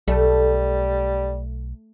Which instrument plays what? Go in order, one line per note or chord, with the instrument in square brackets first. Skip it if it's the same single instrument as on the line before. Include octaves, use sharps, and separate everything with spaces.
[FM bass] B1 [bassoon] G3 [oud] A3